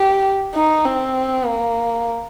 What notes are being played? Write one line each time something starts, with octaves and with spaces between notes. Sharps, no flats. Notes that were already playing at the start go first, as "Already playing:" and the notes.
Already playing: G4
D#4
C4
A#3